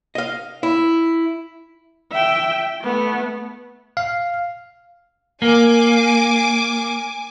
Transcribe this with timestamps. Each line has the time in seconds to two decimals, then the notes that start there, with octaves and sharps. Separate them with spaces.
0.15 D#5 F5
0.63 E4
2.11 E5 G5
2.81 A3 B3
3.97 F5
5.42 A#3 G#5 D6